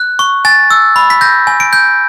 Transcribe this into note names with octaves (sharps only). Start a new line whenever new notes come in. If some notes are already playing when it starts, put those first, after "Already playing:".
Already playing: F#6
C#6
G#5 A6
E6
B5
B6
G6 A#6
G#5
D7
G6